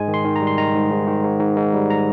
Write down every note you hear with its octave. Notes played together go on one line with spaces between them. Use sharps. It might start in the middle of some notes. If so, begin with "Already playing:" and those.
Already playing: G#2 G#3 G#5
D#3
C6
D#3
A#5
G3
C6
D#3 A#5
G#2
G#2
D#3
G#2
G#2
G#2
G3
A#5